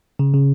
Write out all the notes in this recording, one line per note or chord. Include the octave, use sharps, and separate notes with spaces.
C#3
C#3